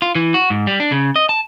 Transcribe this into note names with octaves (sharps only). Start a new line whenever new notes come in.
F4
E3
F#4
G#2
G3
D4
C#3
D#5
A5